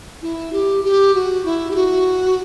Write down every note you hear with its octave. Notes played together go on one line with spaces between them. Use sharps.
E4
G4
G4
F#4
E4
G4
F#4